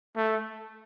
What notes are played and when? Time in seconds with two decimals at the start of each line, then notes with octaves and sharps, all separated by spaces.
0.16 A3